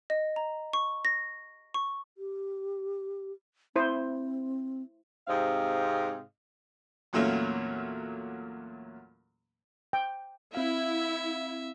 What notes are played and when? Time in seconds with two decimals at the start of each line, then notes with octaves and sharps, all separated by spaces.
0.10 D#5
0.36 A#5
0.73 C#6
1.05 A#6
1.74 C#6
2.18 G4
3.76 C4 E4 C5
5.28 G#2 C3 C4 D#5 F5
7.13 E2 A#2 F#3 A3 A#3 C#4
9.93 G5
10.55 C4 E4 E5 F5